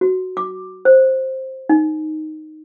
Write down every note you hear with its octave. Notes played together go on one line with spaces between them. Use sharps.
F#4
D6
C5
D#4